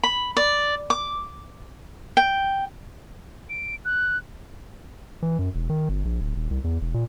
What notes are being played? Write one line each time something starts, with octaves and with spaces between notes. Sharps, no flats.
B5
D5
D6
G5
D7
F#6
E3
F#2
E1
D#3
G1
A#1
D1
D#1
C2
E2
E1
A#2